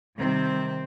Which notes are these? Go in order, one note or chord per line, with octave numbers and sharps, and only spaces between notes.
C3 D#3 G3 C4